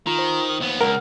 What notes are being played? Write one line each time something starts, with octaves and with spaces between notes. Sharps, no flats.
D#3 F4 A#5
C5
D#2 B3
C#2 A#4 F#5 F6